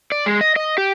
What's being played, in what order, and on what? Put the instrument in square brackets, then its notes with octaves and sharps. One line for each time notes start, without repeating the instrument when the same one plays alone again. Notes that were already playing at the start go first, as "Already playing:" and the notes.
[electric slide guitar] D5
G#3
D#5
D#5
G4